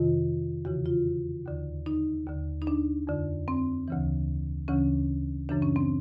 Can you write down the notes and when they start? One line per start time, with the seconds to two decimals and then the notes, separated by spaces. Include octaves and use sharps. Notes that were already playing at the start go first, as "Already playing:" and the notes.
Already playing: F2 C3 D#3 F4
0.65 E2 C#3 E3 F#4
0.86 F4
1.46 D#2 D3
1.86 D#4
2.27 D#2 D3
2.62 D#4
2.67 D4
3.07 F2 D3
3.48 C4
3.88 D2 C#3 E3
4.68 D2 C#3 E3 C#4
5.49 F#2 C#3 E3 D4
5.62 C#4
5.76 C4